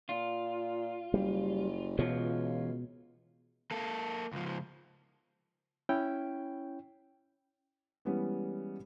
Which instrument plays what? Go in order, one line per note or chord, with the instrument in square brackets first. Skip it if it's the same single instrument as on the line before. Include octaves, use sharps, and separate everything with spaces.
[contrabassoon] A#2 [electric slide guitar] F4
[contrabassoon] F#1 [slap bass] G3
[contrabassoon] C#2 [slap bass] B2 [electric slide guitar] E3 F4 C#5
[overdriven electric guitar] A#3 A4
C#2 F3
[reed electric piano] C#4 E4 C#5 G5
[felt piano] E3 G3 G#3 B3 C#4